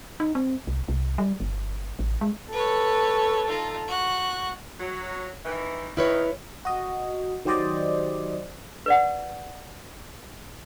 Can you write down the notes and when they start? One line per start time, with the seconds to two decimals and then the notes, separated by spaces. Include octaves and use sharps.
0.20 D#4
0.35 C4
0.67 C2
0.88 C2
1.18 G3
1.40 G1
1.99 A1
2.21 G#3
2.52 A4 B4 C#5
3.48 D#4 F4
3.87 F#4 F#6
4.80 F#3
5.45 D#3 E3
5.97 D#3 E4 B4 C#5
6.65 F#4 D#5
7.45 D#3 F#3 G4 C5 D5 D#5
8.86 B4 D5 F#5